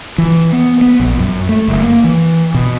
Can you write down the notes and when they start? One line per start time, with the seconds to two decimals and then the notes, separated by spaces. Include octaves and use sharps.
0.18 E3
0.53 B3
0.81 B3
1.00 A#1
1.19 F#2
1.49 A3
1.68 F#1
1.82 A#3
2.04 E3
2.54 B2